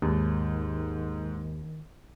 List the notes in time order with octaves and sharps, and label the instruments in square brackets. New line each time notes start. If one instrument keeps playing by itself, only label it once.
[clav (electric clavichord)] D#2 [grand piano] G#2 [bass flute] D#3